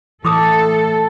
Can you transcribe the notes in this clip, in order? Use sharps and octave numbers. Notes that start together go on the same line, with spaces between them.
A2 E3 A4 C6 D6 D#6